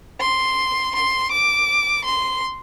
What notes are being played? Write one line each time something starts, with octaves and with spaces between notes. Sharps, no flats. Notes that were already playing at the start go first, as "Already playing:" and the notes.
C6
C6
D6
C6